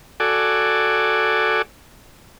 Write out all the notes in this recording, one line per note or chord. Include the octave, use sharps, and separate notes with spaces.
F#4 A4 D5 G#5